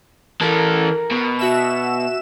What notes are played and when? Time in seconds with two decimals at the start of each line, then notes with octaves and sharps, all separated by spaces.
0.41 E3 A4 A#4
1.11 B2
1.39 F#4 E5 E7